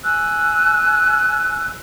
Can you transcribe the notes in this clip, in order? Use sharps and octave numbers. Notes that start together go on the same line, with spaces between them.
G#5 E6 F#6